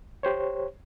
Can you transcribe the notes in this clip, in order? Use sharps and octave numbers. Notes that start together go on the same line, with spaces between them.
G4 C5 C#5